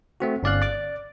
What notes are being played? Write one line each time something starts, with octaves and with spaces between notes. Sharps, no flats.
A3 C4 F#4
G1 C#4 D5 F5 F#6
D5 D6